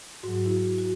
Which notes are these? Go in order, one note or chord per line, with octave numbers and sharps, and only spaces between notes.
G#2 F#3 F#4
E4
F#4
F#4